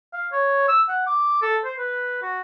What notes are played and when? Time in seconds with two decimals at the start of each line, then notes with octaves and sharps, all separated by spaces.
0.13 F5
0.32 C#5
0.68 E6
0.89 F#5
1.06 D6
1.42 A4
1.64 C5
1.78 B4
2.22 F#4